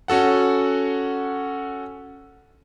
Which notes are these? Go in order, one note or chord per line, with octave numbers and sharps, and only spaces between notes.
C#4 F#4 A4 F#5